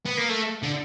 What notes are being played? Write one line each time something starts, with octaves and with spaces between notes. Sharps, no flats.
B3
A#3
A3
D3